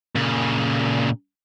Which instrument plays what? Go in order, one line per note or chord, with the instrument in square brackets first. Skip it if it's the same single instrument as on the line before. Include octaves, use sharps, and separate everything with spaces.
[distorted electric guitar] A#2 C#3